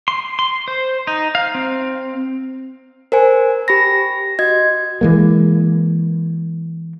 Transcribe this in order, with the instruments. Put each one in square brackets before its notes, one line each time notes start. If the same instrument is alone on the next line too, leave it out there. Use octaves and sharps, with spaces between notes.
[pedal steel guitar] C6
C6
C5
D#4
F5
C4
[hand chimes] A#4 C5 G#5
G4 B5 A#6
F#4 D#5 G#6
[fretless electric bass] E3 G#3 A#3